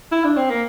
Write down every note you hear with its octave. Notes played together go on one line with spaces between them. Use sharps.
E4
D4
C4
A#3